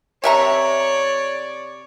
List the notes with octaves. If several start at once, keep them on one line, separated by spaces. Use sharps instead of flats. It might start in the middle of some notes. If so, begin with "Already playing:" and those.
C3 C#5 D5 E5 A#5